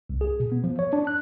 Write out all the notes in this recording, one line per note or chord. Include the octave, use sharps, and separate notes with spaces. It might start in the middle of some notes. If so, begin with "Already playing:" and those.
C2
G#4
B2
B3
F3
C#5
D4
F#6